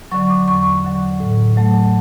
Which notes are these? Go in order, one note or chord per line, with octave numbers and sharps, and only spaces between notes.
D3 F#3 C#6
D6
E2 C#6
D3 F#3
A2
F#3 A3